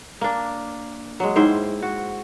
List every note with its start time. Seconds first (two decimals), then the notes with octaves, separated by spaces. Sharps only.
0.21 A#3 D4
1.20 F#3 G#3
1.36 G#2 E4 C5 G5
1.82 F#4